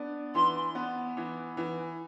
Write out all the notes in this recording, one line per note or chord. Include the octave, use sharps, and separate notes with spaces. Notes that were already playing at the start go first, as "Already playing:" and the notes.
Already playing: B3 D4
E3 C6
B3
E3
E3